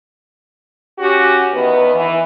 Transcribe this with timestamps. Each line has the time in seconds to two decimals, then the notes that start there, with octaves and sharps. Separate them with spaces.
0.99 C#4 F#4 G4
1.53 E2 D#3 B3
1.95 E3